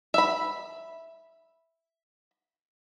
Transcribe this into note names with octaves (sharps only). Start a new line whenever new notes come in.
E5 B5